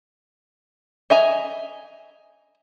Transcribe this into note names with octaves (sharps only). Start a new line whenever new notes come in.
D#5 E5 G#5 A#5